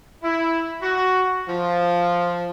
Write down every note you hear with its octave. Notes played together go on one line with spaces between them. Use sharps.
E4
F#4
F3